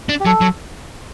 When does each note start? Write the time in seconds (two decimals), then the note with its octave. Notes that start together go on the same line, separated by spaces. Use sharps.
0.09 D4
0.20 G4
0.26 F#3 A4
0.41 F#3